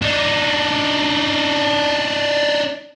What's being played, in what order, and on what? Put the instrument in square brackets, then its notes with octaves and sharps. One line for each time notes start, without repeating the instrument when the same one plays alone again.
[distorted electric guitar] D4 D#4